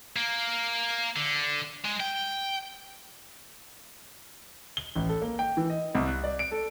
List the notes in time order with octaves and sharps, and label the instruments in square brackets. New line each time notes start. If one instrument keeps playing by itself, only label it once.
[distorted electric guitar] A#3
D3
G#3
G5
[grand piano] G7
A1
A4
A#3
G5
E3
D#5
C2
F#6
D5
D7
A4